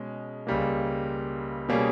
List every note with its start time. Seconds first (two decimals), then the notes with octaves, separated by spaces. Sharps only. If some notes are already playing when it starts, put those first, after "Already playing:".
Already playing: B2 G#3 C#4
0.47 C#2 C#3 G3 A#3
1.69 B2 G3 A#3 C#4 G#4